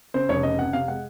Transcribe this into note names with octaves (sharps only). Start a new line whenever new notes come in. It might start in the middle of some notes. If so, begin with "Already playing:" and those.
C#3 C5
F1 C#5
C#3 D#5
F2 F#5
C3 F5
G#3 F#5